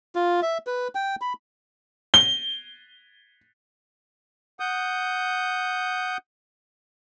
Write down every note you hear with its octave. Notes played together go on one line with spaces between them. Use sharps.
F4
E5
B4
G5
B5
G7
F#5 D#6 G6